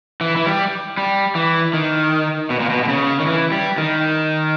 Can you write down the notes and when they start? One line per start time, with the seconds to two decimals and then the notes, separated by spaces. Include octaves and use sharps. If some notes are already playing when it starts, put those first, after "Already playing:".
0.21 E3
0.36 E3
0.46 G3
0.97 G3
1.35 E3
1.73 D#3
2.50 B2
2.60 A#2
2.70 B2
2.83 B2
2.88 C#3
3.20 D#3
3.27 E3
3.52 G3
3.78 D#3